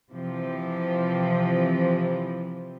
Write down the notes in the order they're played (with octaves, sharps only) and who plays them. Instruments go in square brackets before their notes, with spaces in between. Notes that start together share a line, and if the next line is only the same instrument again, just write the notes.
[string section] C3 E3 F3